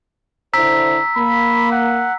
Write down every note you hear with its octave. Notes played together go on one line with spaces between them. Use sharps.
D3 E4 C5 A#5 E6 B6
A#3 B5
F#5